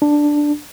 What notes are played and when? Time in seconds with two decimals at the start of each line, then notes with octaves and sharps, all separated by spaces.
0.02 D4